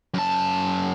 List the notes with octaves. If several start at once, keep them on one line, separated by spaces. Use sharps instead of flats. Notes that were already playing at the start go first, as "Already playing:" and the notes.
F#2 A5